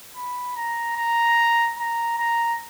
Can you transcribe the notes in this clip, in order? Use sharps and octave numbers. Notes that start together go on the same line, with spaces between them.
B5
A#5
A#5
A#5
A#5